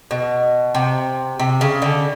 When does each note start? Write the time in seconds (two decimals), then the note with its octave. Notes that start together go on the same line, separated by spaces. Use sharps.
0.11 B2
0.75 C3
1.39 C3
1.61 C#3
1.82 D3